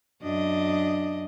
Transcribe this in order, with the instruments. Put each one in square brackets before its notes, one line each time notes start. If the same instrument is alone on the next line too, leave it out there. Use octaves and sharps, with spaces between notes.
[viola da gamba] F#2 D4 D#5